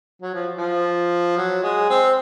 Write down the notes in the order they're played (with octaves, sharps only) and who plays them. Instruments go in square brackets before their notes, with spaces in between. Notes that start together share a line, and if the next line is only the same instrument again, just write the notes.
[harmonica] F#3
F3
F3
F#3
G#3
C4